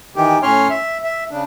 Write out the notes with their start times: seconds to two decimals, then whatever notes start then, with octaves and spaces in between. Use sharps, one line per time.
0.16 D#3 E3 G4
0.43 A2 C#4 C#5 C6 F6
0.70 E5
1.04 E5
1.31 C#3 D4